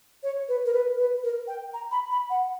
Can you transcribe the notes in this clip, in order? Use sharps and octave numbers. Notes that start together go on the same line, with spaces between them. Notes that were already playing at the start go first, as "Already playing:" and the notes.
C#5
B4
A#4
B4
B4
A#4
G5
A#5
B5
B5
F#5